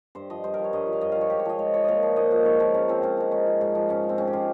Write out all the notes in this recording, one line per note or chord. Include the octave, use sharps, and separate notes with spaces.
G2 C5
F3 D#5
G2 C5
A#4
F3
C#5
G2 D#5
F3
F5
G2 D#5
F3 F5
C#5
G#2 G4
C#5
F3 D#5
G#2 C#5
F3 C#5
A#2 D#5 F5
F3
A#2 D#5
F3 D#5
G#2 C#5
F3 A#4
G#2 C#4
F3 C4
G#2 C#4
F3 D#4
G#2 C#4
F3
G#2
F3
G#2 C#4
F3
C4
G#2 C#4
G4
F3 F4